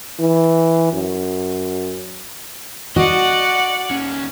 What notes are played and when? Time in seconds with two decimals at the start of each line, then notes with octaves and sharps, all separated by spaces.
0.19 E3
0.93 F#2
2.96 F#4 D5 D#5 F#5
3.90 D#2 C#4